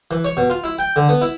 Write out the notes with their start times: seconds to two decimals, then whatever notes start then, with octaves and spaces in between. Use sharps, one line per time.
0.11 E3
0.25 C#5
0.37 B2
0.50 F4
0.64 E4
0.78 G5
0.96 D3
1.09 B3
1.22 E4